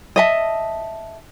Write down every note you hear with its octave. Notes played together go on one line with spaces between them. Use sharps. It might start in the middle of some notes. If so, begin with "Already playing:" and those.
D#5 E5 A5